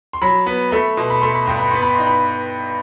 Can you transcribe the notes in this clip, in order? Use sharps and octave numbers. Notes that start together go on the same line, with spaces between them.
C6
F#3 B5
B3
A3 B5
B2 C6
B5
A3 C6
B5
G2 C6
B5
B3 C6
B5
D#4 C6
B5